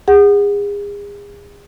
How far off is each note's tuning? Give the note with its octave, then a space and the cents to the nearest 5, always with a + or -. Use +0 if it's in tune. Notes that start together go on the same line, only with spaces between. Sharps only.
G#4 -35 F#5 +0